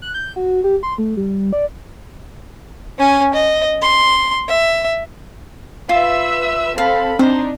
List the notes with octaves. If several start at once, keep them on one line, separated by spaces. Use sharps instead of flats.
F#6
G6
F#4
G4
C6
A3
G3
D5
C#4 G#5
D#5
C6
E5
F4 B4 E5 E6
C4 A4 F5 B5
C4 D4 D#4 C5